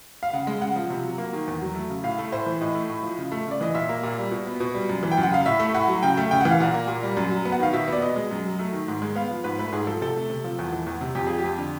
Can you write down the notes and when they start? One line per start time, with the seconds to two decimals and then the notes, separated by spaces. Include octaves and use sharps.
0.23 F5
0.33 C#3 F#5
0.47 G#3
0.61 C#3 F#5
0.76 F3
0.90 C3
1.04 F#3
1.18 A#3
1.33 D#3
1.48 E2
1.62 F#3
1.75 A3
1.89 C#3
2.03 A2 F5
2.18 A3
2.32 A2 C5
2.46 E3
2.61 A2 D#5
2.75 A3
2.89 A2
3.03 F3
3.19 C#3
3.32 A3
3.47 C#3 D5
3.61 E3 D#5
3.74 A#2 E5
3.89 A#3
4.03 A#2
4.18 G3
4.31 B2
4.46 B3
4.60 B2
4.75 G3
4.89 F#2
5.03 E3
5.12 G5
5.18 F#2
5.23 F#5
5.31 C#3 F5
5.46 A2 E5
5.60 A3
5.74 A2 F#5
5.88 F#3
6.03 C#3 G5
6.17 A3
6.31 C#3 G5
6.41 E3 F#5
6.51 F5
6.60 A#2 F#5
6.74 A#3
6.88 A#2
7.03 G3
7.17 F#2
7.30 F#3
7.45 B3
7.52 F#5
7.60 D#3 F5
7.73 B2 E5
7.88 B3 D5
8.02 B2 D#5
8.16 G#3
8.31 F#2
8.45 F#3
8.59 A3
8.73 D#3
8.88 G#2
9.02 G#3
9.15 B3 F5
9.31 F3
9.44 G#2 B4
9.59 A3 B4
9.72 G#2 G#4
9.87 F3 A4
10.01 C3 A4
10.16 A3
10.30 C3
10.44 F3
10.59 E2
10.73 E3
10.87 E2
11.01 C3
11.15 F2 G4
11.27 F3 G#4
11.39 G4
11.44 F2
11.58 D3